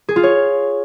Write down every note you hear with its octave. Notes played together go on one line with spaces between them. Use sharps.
G#4
F4
C#5